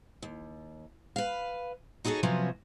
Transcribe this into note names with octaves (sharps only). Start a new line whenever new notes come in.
D#2
B4 F5
D#4 F#4 G#4 A4 C#5
C3 F3 F#3 B3 C#4